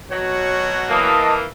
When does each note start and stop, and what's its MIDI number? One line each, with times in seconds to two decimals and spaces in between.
0.11 1.11 47
0.11 1.11 54
0.11 1.11 66
0.11 1.06 73
0.89 1.45 52
0.89 1.45 58
0.89 1.33 75
0.89 1.33 81
0.89 1.33 87